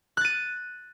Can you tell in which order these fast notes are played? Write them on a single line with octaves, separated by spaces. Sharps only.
F#6 A6 D#7